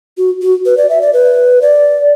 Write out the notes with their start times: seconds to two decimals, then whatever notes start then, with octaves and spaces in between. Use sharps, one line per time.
0.18 F#4
0.42 F#4
0.66 B4
0.77 D5
0.89 E5
1.01 D5
1.13 B4
1.62 D5